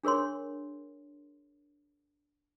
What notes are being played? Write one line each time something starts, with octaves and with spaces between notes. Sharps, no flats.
D4 G#4 A#4 C#5 C6